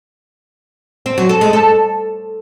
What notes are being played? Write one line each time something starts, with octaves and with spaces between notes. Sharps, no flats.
C4
F#3
A4
G#3
A4